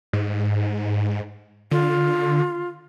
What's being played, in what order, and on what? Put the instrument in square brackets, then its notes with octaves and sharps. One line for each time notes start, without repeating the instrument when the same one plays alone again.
[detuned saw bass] G#2
[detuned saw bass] D3 [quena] F4